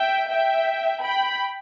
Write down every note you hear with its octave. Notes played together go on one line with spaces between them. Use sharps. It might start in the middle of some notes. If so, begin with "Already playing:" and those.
Already playing: E5 G5
E5 G5
G5 B5